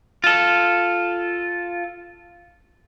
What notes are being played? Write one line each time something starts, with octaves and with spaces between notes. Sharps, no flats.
F4 A4